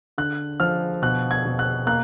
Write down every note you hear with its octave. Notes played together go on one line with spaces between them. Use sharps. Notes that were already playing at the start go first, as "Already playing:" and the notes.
D3 F#6
F3 F6
B2 F#6
G#6
B2
F#6
A#3 F#6